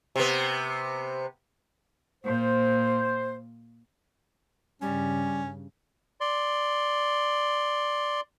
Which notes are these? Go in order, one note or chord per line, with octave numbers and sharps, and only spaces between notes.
C3 B3
A#2 C5
G2 C#3 G3 C#4
D5 C6